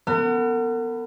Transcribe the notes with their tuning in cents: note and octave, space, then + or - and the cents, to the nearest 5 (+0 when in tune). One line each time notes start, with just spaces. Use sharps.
B3 +0 A#4 -45